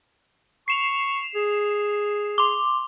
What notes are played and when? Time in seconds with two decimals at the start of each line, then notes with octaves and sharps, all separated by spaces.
0.68 C#6 C7 E7 F7
1.35 G#4
2.38 C6 D6